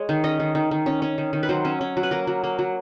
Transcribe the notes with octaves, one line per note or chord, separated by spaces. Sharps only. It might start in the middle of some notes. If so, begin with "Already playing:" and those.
Already playing: G#3 C#5
D#3
C#4 D#5
D#3
D#3
D#3
C#4
C#4
D#3
D#3
B4
F#3 C5
C#4
C#4
F#3
B4
A#3 A#4
F#3
A#3
F#3